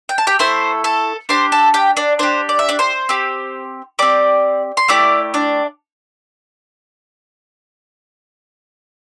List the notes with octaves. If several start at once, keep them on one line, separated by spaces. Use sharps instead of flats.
G5
A5
G4 G5
A3 E4 A4 C5 C6
A4 A5
D4 G4 C5 C6
A4 A5
G4 G5
D4 D5
D4 G4 C5
D5
E5
D4 D5
C5 C6
C4 G4
C4 G4 D5 D6
C6
A3 E4 G4 D5 D6
D4 D5